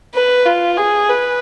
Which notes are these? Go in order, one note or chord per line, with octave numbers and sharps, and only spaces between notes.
B4
F4
G#4
B4